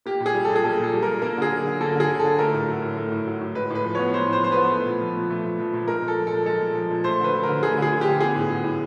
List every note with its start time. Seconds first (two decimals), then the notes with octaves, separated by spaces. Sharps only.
0.06 A#3 G4
0.20 A#2
0.26 G#4
0.35 G3
0.45 A4
0.50 A#2
0.56 G#4
0.64 A#3 A4
0.79 A#2 A4
0.93 G3
1.03 A#4
1.08 A#2
1.22 A#3 A#4
1.37 D3 G#4
1.52 F#3
1.66 D3
1.81 A#3 A4
1.95 D3 G#4
2.10 F#3
2.20 D3 A4
2.39 A3 A#4
2.53 A2
2.68 F#3
2.82 A2
2.97 A3
3.12 A2
3.27 F#3
3.41 A2
3.55 G#3 B4
3.70 A2 B4
3.84 F3
3.95 B3 C#5
4.14 G#3 C5
4.28 A2 C5
4.43 F3 C5
4.52 B4
4.57 B3
4.71 A3
4.86 A#2
5.01 F3
5.16 A#2
5.30 A3
5.45 A#2
5.60 F3
5.73 A#2
5.88 G#3 A#4
6.02 A#2
6.08 A4
6.17 F3
6.27 A4
6.32 A#2
6.46 G#3 A4
6.61 A#2
6.75 F3
6.91 A#2
7.04 A3 C5
7.20 D3 B4
7.33 F#3
7.43 A#4
7.49 D3
7.62 A3 G#4
7.77 D3
7.82 G#4
7.92 F#3
8.01 G4
8.07 D3
8.20 B3 G#4
8.35 A2
8.50 F#3
8.64 A2